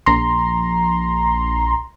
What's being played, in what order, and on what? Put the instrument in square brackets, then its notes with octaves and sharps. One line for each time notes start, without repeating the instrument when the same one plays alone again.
[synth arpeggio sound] A#1 A#5 C6